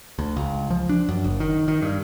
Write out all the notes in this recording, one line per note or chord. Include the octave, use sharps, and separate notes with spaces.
D2
C#2
F3
D4
F#2
F#1
D#3
D#3
G2